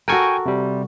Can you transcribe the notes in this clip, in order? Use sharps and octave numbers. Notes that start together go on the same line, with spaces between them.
F#4 A4 A#4 G5 G#5 C#6
C3 G3